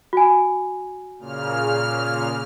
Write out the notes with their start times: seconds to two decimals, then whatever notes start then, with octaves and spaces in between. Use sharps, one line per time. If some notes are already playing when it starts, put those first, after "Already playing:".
0.13 F#4 G#5
1.19 A#2 C#3 F6